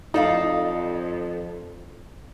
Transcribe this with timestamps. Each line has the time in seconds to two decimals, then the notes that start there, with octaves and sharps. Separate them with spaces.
0.14 F2 D#4 A4 D5 F5